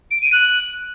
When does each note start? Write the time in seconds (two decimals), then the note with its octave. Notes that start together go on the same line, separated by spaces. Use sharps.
0.11 D7
0.22 D#7
0.33 F#6